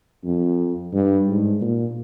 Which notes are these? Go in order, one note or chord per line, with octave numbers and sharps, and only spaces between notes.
F2
G2
G#2
A#2